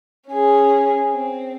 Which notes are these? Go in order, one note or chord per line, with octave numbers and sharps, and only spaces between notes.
C#4 G#4
C4